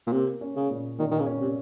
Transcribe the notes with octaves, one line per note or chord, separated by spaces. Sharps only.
A#2
C3 A#3
C#4
C#3
A#2
A#2 D#3
D#3
C#3
C#4
C3